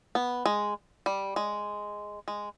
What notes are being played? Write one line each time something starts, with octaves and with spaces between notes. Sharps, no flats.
B3
G#3
G3
G#3
G#3